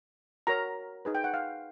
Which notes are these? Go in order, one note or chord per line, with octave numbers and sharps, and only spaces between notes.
F#4 A#4 C#5 A#5
D#4 G#4 B4
G5
F#5
F5